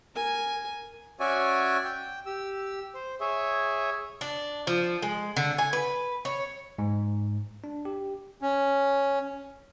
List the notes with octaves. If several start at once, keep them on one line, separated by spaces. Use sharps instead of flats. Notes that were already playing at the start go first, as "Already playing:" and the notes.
A#4 G#5
C#4 F#4 C#5 D5 E5 G#5
G5
G4 E6
C5
G#4 C#5 E5
D4
F3
G#3
D3
G#5
B4
C#5
G#2
D4
G4
C#4